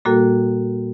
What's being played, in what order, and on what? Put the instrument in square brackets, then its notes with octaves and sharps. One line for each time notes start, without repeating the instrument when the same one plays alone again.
[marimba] A#2 G3 A#3 F#4 A4